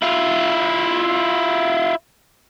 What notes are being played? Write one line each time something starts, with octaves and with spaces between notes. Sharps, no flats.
E4 F4